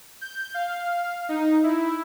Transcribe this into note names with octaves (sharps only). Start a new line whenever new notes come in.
G6
F5
D#4
E4